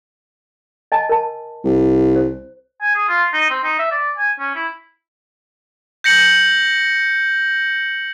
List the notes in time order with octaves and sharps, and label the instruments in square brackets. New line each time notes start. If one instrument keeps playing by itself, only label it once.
[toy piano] D#5 G#5 A5
A#4 A5
[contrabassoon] C2
[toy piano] C5
[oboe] G#5
G#4
F4
D#4
C4
D#4
E5
D5
G#5
C#4
E4
[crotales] G6 A#6 C#7 F#7